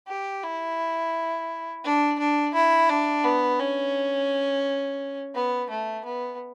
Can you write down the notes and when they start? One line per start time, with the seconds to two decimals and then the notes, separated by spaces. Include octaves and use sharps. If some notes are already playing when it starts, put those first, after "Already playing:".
0.08 G4
0.43 E4
1.84 D4
2.19 D4
2.54 E4
2.89 D4
3.24 B3
3.59 C#4
5.35 B3
5.70 A3
6.05 B3